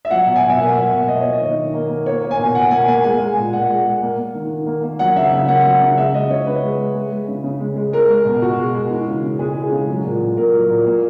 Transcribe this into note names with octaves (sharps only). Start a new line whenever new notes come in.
E5
F#3 F#5
B2
G#5
B2
E5
A#3 F#5
F#3
B2
A#3 D#5
A#3 C#5
D#5
D#3
D#3
A#3
A#3
A#3 C#5
A#3
G#5
B2
B2 F#5
A#3 G#5
A#3 G#5
G#3 G#5
G#3
A#2
A#2 F#5
G#3
G#3
A#3
A#3
D#3
D#3
A#3
A#3
F#3 F#5
C#3 E5
C#3
A#3 F#5
F#3
C#3
G#3 E5
G#3 D#5
C#3 C#5
C#3 B4
G#3
G#3
G#3
G#3
C#3
C#3
G#3
G#3
G#3 A#4
G#3
B2
B2 F#4
G#3
G#3
E3
C#3
C#3
G#3 G#4
E3
G#4
C#3
F#3
A#2
A#2
A#3 A#4
F#3
A#2
A#3